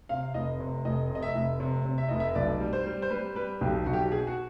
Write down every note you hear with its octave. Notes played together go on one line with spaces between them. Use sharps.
C3 F5
F1 D#5
C3
F1 D#5
C3 D#5
E5
F1
C3
C3
E5
F1 D#5
E5
B1 D5
G3
C5
G3
C5
G3 B4
G3 B4
B1 G4
B1 F#4
G4
F#4
B2 G#4
F#4